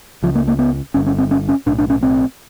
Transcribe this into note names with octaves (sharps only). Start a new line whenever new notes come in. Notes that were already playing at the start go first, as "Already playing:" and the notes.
C#2 C#3 F3
A#3
A#3
B3
G1 G2 D3 C#4
C#4
C4
C#4
C#4
B1 A2 D4
D4
C#4
C4